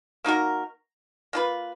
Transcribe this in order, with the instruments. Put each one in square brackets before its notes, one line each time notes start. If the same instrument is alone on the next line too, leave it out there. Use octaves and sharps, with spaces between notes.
[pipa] A#3 D#4 F#4 A#4
A#3 F4 B4